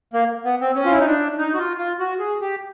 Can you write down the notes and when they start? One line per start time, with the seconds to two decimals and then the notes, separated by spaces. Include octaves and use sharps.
0.14 A#3
0.45 B3
0.61 C4
0.76 C#4
0.86 F4
0.92 E4
0.99 D#4
1.06 D4
1.38 D#4
1.54 F#4
1.58 F4
1.78 F4
2.00 F#4
2.19 G#4
2.41 G4